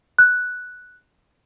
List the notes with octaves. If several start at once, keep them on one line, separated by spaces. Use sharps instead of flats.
F#6